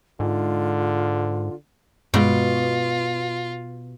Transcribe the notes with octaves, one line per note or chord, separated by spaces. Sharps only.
G#2 D3 F4
G2 B2 G#3 F4